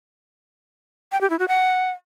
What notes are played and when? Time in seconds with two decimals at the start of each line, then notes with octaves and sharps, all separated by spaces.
1.12 G5
1.21 G4
1.30 E4
1.39 F#4
1.48 F#5